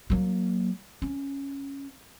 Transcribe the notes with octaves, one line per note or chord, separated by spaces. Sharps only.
F#3 A#3
C#4